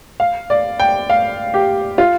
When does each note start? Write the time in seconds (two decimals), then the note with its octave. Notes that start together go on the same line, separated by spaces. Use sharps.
0.20 F5
0.50 D5
0.80 G5
1.10 F5
1.54 G4
1.98 F4